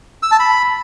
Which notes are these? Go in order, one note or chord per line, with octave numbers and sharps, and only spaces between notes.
E6
A5
B5